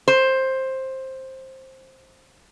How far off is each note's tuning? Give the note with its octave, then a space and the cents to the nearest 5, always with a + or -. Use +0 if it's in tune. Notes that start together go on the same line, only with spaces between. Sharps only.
C5 +10